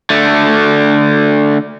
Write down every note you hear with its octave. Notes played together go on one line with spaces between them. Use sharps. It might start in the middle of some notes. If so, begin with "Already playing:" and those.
D3 A3